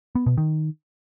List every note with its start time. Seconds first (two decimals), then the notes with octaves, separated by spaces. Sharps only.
0.15 B3
0.26 B2
0.37 D#3